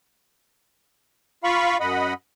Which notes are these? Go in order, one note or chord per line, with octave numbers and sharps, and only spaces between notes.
F4 F5 B5 C#6
F#2 D#5 F#5 B5